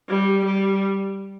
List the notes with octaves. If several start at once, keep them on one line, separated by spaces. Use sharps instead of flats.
G3
G3